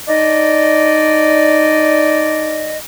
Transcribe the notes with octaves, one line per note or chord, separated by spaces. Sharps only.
D4 D#4 D5 D#5